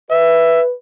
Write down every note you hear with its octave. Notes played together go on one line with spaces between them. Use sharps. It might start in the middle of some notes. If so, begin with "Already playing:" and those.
B4 E5